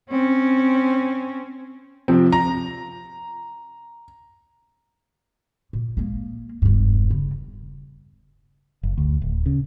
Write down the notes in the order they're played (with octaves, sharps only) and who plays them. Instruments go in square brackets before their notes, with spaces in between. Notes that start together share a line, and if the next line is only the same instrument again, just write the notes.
[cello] C4 C#4
[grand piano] C3 F3 C4
A#5
[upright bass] A#2
G#3 A#3
E1 G2
C#3
[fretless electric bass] F#1
D2
D1
C#3